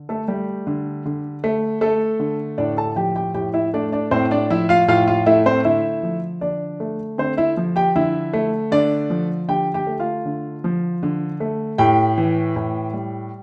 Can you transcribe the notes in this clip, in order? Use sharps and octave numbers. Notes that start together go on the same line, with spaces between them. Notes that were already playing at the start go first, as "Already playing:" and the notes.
Already playing: D3
A3 A4
G3 A3 G4
D3
D3
A3
A3 A4
D3
A2 D4 D5
A4 A5
F3 G4 G5
G4 G5
A2 G4 G5
E4 E5
A3 D4 D5
D4 D5
A2 C4 C5
D4 D5
F3 E4 E5
F4 F5
A2 F4 F5
F4 F5
A3 E4 E5
C4 C5
D3 E4 E5
F3
D3 D4 D5
A3
D3 C4 C5
E4 E5
F3
G4 G5
D3 E4 E5
A3
D3 D4 D5
F3
D3 G4 G5
G4 G5
A3
F4 F5
D3
F3
D3
A3
A2 G4 G5
E3
A2
G3